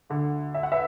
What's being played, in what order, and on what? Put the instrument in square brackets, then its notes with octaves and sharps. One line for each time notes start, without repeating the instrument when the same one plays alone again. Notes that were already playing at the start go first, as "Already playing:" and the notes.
[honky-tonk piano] D2 D3
E5
F#5
B4 E5